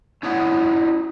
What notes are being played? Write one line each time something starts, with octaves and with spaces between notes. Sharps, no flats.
C#4 D#4 E4 C#5 D5 F#5